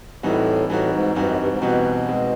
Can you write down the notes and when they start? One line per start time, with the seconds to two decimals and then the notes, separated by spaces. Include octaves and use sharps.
0.23 A2 E3 G3 C4 D#4 F#4
0.70 A2 E3 G3 C4 D#4 F#4
0.92 G#2
1.15 G2 E3 G3 C4 D#4 F#4
1.27 F#2
1.38 G2
1.50 G#2
1.62 B2 E3 G3 C4 D#4 F#4
2.07 G#3 C4 D#4